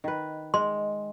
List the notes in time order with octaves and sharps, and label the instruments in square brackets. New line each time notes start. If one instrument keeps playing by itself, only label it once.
[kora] D#3 B4
[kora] G#3 [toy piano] C6